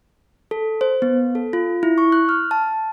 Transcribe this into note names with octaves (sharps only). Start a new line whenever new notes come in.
A4
C5
B3
A4
F4
E4
C#6
F#6
F6
A5